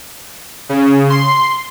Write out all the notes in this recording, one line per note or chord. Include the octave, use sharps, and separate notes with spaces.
C#3
C6